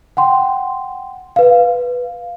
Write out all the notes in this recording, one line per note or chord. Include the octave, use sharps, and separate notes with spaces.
F#5 G5 C6
B4 F5